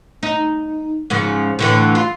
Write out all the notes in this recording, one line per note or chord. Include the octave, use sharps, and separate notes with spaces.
D#4
G#2 C#3 F3
A2 D3 E3
F4